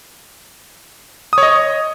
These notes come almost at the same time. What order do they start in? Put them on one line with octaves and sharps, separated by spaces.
D#6 C#5 D#5